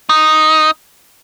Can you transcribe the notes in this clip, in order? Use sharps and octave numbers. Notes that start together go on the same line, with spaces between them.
D#4